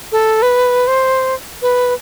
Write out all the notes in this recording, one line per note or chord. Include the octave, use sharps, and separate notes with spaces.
A4
B4
C5
B4